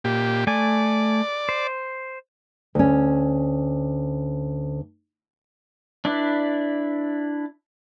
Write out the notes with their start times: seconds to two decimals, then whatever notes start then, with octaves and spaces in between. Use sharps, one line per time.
0.04 A#2 G4
0.47 A3 D5 G#5
1.49 C5
2.75 D2 C#4
6.05 D4 E4 B4 D5